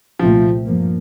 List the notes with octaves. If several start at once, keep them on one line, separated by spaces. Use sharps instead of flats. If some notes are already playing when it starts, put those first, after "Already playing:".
C2 A#2 F3 A3 C4
G2 F3 A#3